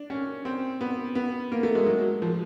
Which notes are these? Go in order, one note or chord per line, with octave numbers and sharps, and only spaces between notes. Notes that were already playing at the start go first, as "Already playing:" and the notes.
Already playing: D4
C#4
C4
B3
B3
A#3
A3
G#3
F#3
F3